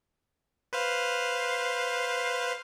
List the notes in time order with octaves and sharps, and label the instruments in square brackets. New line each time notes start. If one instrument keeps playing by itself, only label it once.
[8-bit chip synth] B4 C5 F5